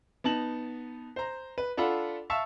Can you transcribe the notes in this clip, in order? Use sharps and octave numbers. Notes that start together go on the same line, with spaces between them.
B3 D#4 A5 F#7
C5 A#5
B4
D4 F4 A4 F#5 B5
E5 F5 A5 C#6 E6